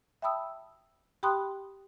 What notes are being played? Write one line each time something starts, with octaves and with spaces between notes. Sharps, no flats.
E5 G5 A5 B5 D#6 E6
G4 G5 B5 C6 D#6 F#6